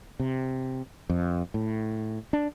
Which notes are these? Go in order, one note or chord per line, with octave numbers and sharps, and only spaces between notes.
C3
F2
A2
D4